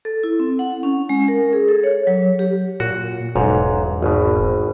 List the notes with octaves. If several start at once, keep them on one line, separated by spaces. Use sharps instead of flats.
A4
E4
C4
F#5
C#4
G#3
A#4
G#4
A4
C#5
F#3
G4
A#2 F#4
E1 B1 G#2
G#1 B2